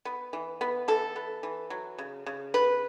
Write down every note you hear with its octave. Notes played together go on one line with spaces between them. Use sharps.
B3
E3
B3
E3 A4
B3
E3
F#3
C#3
C#3
B3 B4